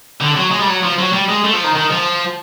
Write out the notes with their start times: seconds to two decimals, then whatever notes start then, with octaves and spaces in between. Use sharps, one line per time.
0.22 D3
0.37 F#3
0.52 G#3
0.60 G3
0.68 F#3
0.83 F3
0.99 F#3
1.13 G3
1.29 G#3
1.45 A3
1.54 F3
1.64 D#3
1.75 D#3
1.90 F3